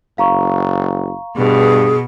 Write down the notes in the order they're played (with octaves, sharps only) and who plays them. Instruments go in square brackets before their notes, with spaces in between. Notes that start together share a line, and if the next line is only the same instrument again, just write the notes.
[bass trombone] F#1 [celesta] F5 A#5 C#6
[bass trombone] G2 [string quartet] B2 [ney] G#4